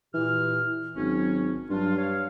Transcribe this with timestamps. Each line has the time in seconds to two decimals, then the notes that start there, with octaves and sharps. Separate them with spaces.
0.14 A#2 E3 G4 F6
0.96 G#1 F#3 C#4
1.70 G2 F#3 D4 F4
1.96 C#5 F5